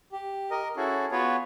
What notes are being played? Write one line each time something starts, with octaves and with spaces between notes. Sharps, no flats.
G4
A#4 D#5
C#4 E4 F#4 G#4 A4
B3 F4 F#4 G#4 B4 C#5